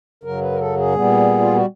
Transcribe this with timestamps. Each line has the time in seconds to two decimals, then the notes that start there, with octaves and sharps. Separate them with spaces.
0.24 F#2 C#3 F#3 A#4
0.41 B4
0.52 A#4
0.59 A4
0.77 G#4
0.95 A#2 G3 B3
1.41 F4
1.53 F#4